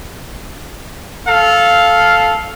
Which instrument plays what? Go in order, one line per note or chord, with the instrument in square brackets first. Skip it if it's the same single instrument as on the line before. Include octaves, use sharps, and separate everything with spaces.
[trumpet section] A4 F5